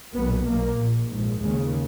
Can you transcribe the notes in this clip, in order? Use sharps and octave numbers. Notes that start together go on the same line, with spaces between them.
B1 A#2 B3
B1 B2 A#3
A#1 A#2
A#1 G#2
D#2 C#3 G#3